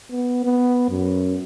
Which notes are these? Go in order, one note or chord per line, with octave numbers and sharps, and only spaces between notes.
B3
B3
F#2